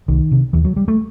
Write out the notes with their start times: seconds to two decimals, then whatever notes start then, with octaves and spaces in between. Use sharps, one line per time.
0.08 C2 D#3
0.32 C3
0.53 D#2 E3
0.65 F#3
0.76 G3
0.88 A3